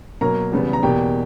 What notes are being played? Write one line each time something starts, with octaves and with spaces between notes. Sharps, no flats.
B2 F#3 A#3 A#4 A#5
E2 C#3 G3 B3
A#5
E2 B2 A#3 G4 G5